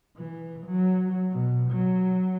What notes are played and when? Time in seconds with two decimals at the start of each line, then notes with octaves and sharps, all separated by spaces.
0.16 E3
0.67 F#3
1.31 B2
1.71 F#3